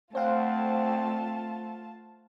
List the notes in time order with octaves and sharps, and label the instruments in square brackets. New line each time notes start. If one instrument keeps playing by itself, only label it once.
[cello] A3 [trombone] C4 [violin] F4 A5 [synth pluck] C5 F5 F#5